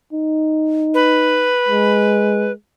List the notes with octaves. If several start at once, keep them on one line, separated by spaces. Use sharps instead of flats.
D#4
B4
G#3